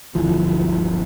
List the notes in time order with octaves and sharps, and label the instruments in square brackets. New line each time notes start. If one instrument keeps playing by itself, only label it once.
[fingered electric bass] D1 G1 E3 F3